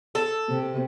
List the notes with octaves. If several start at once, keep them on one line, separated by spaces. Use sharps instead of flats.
A4
C3